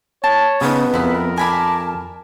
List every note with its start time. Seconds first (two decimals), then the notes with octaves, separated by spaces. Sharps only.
0.24 C#5 A5
0.61 C#3 B3 D#4
0.94 F2 E4 A#4 B5
1.38 G#5 A5 B5 D6